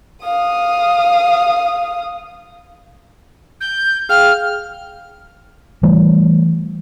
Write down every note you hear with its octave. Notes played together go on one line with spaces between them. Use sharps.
F5 D#6
G6
G#4 F5 G5 F6
E3 G3 A3